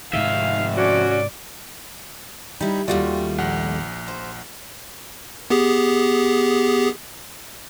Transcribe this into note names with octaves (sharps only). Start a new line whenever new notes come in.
F2 G#2 C3 D#3 E5 F5
C#4 F#4 D5
G3 D#4 E4
D#2 G3 A3 F4 F#4 D5
A#1 F#5
C5
B3 G4 G#4